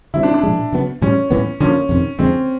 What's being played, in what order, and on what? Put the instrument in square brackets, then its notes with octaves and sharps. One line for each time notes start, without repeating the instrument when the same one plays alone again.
[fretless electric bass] D3 G3 C4 [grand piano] E4
[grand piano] D4
D4
[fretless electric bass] A#2 F3 G#3
C#3 F#3 B3
[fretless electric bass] A2 E3 G3 [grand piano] C#4
[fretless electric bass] A2 E3 G3 B3
[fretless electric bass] D3 F3 A#3 [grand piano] C#4
[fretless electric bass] F2 C3 D#3
[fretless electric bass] F2 D3 F3 G#3 [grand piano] C4